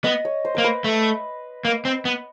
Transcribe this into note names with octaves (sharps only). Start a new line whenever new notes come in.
B3 D#5
C#5
C5
A#3 C5
B4
A3
A#3
C4
B3